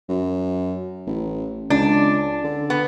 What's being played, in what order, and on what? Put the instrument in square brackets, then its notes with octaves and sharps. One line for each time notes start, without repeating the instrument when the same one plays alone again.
[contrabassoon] F#2
A1
[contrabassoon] C#2 [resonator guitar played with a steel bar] D4
[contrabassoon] D3
[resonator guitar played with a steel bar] B3